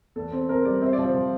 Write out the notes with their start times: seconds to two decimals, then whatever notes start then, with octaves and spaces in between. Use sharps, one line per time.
0.16 E2 A4
0.32 C4
0.49 C4 A#4
0.65 G3 D5
0.82 C4 E5
0.88 C5
0.93 D5
0.98 F3
1.03 C5
1.15 F3